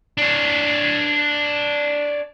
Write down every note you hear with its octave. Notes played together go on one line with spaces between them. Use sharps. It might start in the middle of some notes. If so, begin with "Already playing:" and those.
D4 C#5